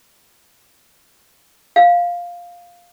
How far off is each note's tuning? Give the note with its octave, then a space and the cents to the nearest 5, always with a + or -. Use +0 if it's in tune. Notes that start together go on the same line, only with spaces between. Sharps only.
F5 +5